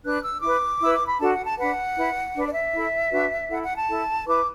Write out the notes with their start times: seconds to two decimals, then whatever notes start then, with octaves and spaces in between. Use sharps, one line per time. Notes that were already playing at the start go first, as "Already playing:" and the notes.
0.04 D4 B4 F#6
0.23 E6
0.42 E4 B4 D6
0.81 E4 B4 E6
0.94 D6
1.07 B5
1.19 D4 F#4 A4 A5
1.32 F#5
1.45 A5
1.57 D4 B4 F#5
1.97 E4 B4
2.35 D4 B4
2.47 D5
2.54 E5
2.74 E4 A4
3.11 D4 F#4 B4
3.50 E4 A4 F#5
3.63 F#5
3.76 A5
3.88 E4 A4
4.27 E4 B4 D6